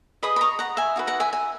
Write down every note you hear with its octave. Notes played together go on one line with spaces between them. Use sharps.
G#4 B4 D#5 B5 D#6
B5
A#5 C#6
F#5 A#5
E5 G#5
D#4 F#4 B4
F#5 A#5
E5 G#5
E5 G#5